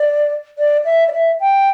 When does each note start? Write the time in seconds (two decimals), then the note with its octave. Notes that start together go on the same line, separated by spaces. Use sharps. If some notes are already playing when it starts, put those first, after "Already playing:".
Already playing: D5
0.58 D5
0.85 E5
1.08 D5
1.12 E5
1.40 G5